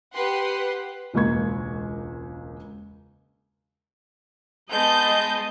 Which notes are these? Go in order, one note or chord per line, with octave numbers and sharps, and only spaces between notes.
G4 B4 F#5 C6
E1 C#2 A#3 C#6 G#6
G#3 B3 D#5 A5 G6